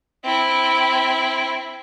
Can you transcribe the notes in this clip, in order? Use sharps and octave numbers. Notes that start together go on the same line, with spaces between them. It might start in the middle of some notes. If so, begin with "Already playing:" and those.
C4 E4